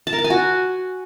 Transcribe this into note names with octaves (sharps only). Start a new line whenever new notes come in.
A5
A#4
A5
G#5
F#4